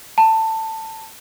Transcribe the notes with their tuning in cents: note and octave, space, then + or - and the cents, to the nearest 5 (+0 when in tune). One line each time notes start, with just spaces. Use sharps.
A5 +15